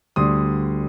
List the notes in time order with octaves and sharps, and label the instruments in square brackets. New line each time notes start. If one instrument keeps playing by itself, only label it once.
[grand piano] D2 D3 G3 C6 D#6